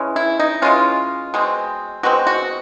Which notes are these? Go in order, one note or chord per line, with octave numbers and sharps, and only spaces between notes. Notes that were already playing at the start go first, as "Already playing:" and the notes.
Already playing: E3 G#3 C#4
E4
D#4
E3 G#3 C#4 F4
B2 G#3 C4
B2 G#3 C4 F#4
F#4